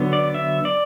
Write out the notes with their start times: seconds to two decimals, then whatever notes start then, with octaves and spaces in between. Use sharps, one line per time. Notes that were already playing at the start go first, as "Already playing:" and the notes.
Already playing: D3 F#3 B3
0.13 D5
0.34 E5
0.65 D5